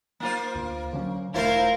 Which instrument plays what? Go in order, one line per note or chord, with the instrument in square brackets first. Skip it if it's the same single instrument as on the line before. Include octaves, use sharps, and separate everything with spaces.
[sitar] A#3 F4 C5
[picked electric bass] D2
D3 F#3 C#4
[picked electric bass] E1 A3 [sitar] E4 F4 C5 [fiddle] A#4 [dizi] F5